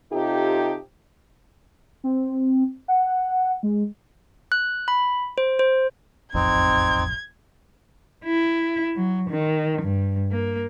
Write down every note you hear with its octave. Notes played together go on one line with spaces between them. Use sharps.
C3 D#4 F4 G4 A4
C4
F#5
G#3
F#6
B5
C5
C5
E1 A1 F2 C4 D#4 G#6
E4
F#3
D#3
G2
A#3